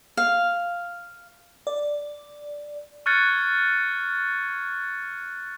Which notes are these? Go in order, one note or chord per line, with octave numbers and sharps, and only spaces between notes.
F5
D5
C#6 F6 F#6 G#6 A6 C#7